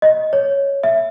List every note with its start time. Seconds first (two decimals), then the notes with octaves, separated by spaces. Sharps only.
0.02 D#5
0.33 C#5
0.83 E5